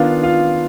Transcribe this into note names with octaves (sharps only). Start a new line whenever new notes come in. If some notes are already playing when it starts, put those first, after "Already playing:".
Already playing: D#3 B3 D4 F4 F5
F4 F5